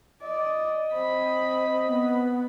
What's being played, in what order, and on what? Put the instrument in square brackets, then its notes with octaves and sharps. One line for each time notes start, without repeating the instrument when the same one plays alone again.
[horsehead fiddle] D5 [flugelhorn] D#5
[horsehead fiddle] C4 B5 [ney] C5
[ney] B3